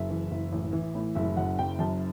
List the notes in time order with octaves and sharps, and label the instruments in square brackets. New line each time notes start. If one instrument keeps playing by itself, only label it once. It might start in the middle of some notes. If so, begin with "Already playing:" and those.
Already playing: [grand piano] F#1 E5
E3
F#1
A1
E3
A2
F#1 E5
F#2 F#5
F#1 G5
F#2 A5